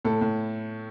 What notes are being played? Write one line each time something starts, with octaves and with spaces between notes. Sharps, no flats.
A2 A4
A2